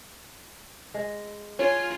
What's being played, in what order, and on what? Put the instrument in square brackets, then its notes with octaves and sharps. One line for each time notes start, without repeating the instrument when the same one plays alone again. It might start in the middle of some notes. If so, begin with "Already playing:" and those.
[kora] G#3
[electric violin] F4 [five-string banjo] C#5 [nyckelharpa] G#5